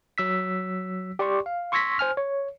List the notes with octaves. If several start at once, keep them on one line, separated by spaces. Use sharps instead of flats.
F#3 E6 B6
G4 D5 G5 C6 C#6
F5
C6 C#6 E6 G#6 A#6 B6
C5 G#5 F6
C#5